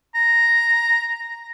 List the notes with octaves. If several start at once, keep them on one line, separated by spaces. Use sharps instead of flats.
A#5